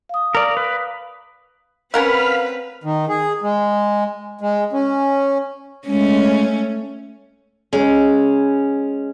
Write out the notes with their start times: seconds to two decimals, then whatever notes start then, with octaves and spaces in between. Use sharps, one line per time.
0.09 F5 D#6
0.35 A#4 D5
0.57 B4
1.94 C4 C#4 A#4 B4 F5 F#5 B5 F6
2.84 D#3
3.09 G#4
3.42 G#3
4.41 G#3
4.73 C#4
5.87 G#3 A3 C#4
7.73 G#3 C#4